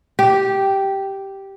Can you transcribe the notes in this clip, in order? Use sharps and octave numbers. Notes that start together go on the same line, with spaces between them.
G4